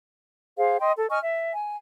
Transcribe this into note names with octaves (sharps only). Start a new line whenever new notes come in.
G#4 C5 F5
D#5 G5 C6
A4
D#5 G#5 C#6 F6
E5
G#5